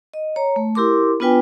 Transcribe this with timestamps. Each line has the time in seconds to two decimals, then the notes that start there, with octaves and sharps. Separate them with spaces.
0.14 D#5
0.36 C#5 A#5
0.56 A3
0.75 E4 G4 A#4 C6 D6
1.20 B3 D4 F4 B4 G5 G#5